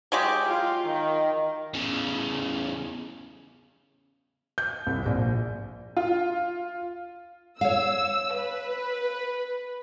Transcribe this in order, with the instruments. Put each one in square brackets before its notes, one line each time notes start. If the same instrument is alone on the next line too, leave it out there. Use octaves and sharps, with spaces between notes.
[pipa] F#3 G#3 G4
[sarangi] F4
D#3
[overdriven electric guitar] E2 C#3
[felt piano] G6
C2
A#1
[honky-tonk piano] F4
[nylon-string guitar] C#5 F5 [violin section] E6
[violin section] B4